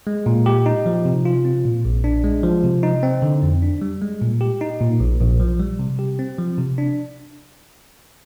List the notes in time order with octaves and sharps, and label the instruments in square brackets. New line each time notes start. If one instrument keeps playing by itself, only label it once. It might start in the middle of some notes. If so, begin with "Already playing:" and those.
[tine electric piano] G#3
A#2
G4
D#4
F3
C3
F4
C4
A#2
A#1
D4
G#3
F3
C3
D#4
C4
D3
F2
D4
G3
G#3
A#2
G4
D#4
A#2
A#1
A#1
F3
G3
C3
G4
C4
F3
C3
D4